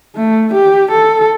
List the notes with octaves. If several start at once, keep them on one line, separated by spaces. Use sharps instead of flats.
A3
G4
A4